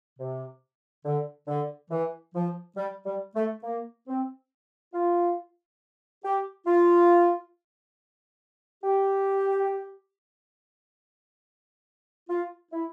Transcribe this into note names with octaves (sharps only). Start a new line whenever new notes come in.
C3
D3
D3
E3
F3
G3
G3
A3
A#3
C4
F4
G4
F4
G4
F4
E4